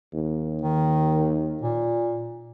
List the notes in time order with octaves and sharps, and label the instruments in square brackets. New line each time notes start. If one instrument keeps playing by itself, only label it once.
[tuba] D#2
[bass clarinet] D#3
A#2